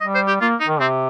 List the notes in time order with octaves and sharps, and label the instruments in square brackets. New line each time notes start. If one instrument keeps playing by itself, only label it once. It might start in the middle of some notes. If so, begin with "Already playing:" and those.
[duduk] G3 [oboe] D#5
[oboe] C5
G4
[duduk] A#3 [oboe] F4
[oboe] D#4
[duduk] D#3
[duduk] C3 [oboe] C4